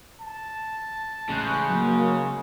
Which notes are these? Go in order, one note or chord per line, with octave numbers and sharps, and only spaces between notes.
A5
A1 C#3 G#3 F#6 G6
F#3 A#3